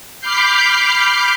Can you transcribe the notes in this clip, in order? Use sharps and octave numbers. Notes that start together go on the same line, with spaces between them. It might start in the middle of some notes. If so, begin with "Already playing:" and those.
B5 D6 F6 G6 C7